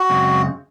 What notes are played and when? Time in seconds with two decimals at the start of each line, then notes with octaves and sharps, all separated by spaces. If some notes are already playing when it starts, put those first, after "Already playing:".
Already playing: F#4
0.10 F#2 C#3 G#3 C4